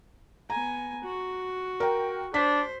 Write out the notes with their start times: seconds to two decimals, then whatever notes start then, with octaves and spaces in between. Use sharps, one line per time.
0.50 B3 G#5 A#5
1.04 F#4
1.80 A#4 G5
2.34 D4 C5 B6